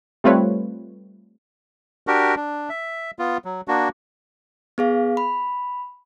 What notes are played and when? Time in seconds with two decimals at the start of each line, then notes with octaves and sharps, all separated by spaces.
0.24 G3 A3 C4 F4 B4 C#5
2.07 D4 F#4 G4 A#4
2.36 D4
2.69 E5
3.19 B3 F4
3.45 F#3
3.68 A#3 D4 F#4
4.78 B3 G#4 F5
5.17 B5